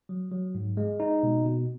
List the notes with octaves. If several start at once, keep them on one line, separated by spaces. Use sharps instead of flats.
F#3
F#3
G#2
G#3
D#4
B2
B2